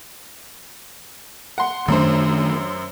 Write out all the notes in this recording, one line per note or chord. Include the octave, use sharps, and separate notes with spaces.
F#5 C6
F#2 D#3 A3 D4 C5